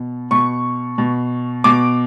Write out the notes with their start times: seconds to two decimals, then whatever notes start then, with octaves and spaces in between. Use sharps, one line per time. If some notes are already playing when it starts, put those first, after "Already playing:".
Already playing: B2
0.31 B2 C#6
0.98 B2
1.64 B2 D6